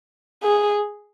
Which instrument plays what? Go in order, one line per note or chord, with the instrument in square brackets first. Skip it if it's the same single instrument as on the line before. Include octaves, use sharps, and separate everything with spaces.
[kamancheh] G#4